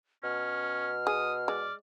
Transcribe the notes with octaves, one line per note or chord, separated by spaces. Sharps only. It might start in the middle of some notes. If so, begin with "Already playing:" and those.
B2 C#4 F6
G#4 D#6
G#3 D5